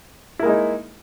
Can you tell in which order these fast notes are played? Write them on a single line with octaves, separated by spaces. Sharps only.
E4 A#3 G#3 D#4